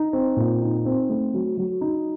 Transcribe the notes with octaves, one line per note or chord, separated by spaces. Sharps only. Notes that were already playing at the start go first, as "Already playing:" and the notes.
Already playing: D#4
C4
A#2
D#4
C4
A3
F#3
F#3
D#4